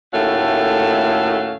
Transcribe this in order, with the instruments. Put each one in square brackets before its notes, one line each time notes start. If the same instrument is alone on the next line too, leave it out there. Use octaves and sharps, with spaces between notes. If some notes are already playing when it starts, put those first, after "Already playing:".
[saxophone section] D#2 A2 A3 C#4 F#4 F5